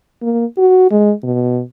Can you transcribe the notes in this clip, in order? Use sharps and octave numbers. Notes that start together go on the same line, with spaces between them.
A#3
F#4
G#3
B2